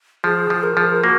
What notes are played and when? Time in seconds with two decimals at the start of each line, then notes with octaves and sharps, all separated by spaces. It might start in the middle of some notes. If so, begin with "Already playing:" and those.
0.24 F3 G#4
0.50 F3
0.63 A#4
0.76 F3 G#4
0.90 A#4
1.03 A#3 F#4